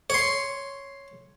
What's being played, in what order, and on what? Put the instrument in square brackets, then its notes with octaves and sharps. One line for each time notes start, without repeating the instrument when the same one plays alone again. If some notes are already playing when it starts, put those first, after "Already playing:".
[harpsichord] C#5 C6